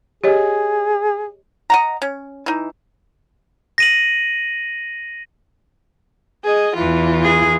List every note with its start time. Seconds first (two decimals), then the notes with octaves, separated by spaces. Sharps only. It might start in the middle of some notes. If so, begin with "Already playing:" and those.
0.24 G4 G#4 C#5 D#5
1.70 D#5 F#5 A#5
2.02 C#4
2.46 E3 D#4
3.78 A#6 D#7 F#7
6.44 G#4 D#5
6.75 E2 E3 F4
7.24 G#4